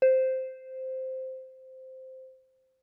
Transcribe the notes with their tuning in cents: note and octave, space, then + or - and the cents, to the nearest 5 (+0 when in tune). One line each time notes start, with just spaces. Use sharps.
C5 -5